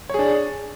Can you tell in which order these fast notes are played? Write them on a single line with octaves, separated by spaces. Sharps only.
C#5 G#4 D4